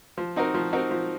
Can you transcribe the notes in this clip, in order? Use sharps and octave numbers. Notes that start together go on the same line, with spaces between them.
F3
C4 D#4 F#4 A#4
F3
C4 D#4 F#4 A#4
F3